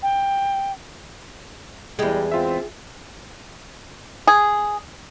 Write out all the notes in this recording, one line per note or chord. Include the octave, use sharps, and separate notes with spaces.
G5
E2 G3 G#3 G#4 G5
C4 F4 E5
G#4